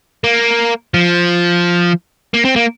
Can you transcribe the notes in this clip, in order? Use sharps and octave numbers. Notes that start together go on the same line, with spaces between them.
A#3
F3
A#3
C4
A#3